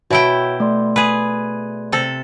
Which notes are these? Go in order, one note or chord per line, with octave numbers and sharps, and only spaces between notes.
B2 E4 F#4 C#5 E5 G5
A3 D5 C6
G#4 B4
C3 A4